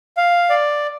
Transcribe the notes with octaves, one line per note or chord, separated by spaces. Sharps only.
F5
D5